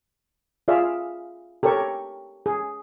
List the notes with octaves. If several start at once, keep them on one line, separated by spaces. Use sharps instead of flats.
F4 G#4 D5 E5 F5
G4 A4 A#4 C#5 C#6
G#4